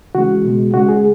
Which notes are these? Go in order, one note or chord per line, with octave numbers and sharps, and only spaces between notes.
C#3 E3 G#3 F#4
B2 G#3
C#3 G#3 F#4
G#4